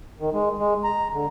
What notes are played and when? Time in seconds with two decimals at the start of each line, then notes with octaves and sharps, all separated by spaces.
0.20 D#3
0.33 G#3
0.58 G#3
0.84 A#5
1.13 D3